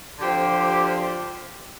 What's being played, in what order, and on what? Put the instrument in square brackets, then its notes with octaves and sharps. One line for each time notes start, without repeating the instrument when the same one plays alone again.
[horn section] D3 F3 C4 G4